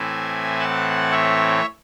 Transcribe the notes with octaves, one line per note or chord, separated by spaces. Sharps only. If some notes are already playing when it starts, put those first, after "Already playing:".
Already playing: A2 E3 C4 E5 G#5
F#5 A5
C#5 E5